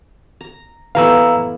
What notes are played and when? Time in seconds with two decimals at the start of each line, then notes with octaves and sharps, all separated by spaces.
0.41 A#5
0.95 E3 A3 B3 F5 A#5 E6